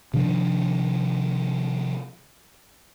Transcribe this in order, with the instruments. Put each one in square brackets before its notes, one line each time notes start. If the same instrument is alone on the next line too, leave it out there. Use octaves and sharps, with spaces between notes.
[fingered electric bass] C3 D#3 F3 D4